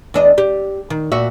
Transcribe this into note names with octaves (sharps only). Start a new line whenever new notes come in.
E2 D4 D#5
G4
D#3
A#2 F#4 E5